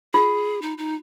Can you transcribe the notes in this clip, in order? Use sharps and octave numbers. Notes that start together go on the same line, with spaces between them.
F4 G#4
D#4
D#4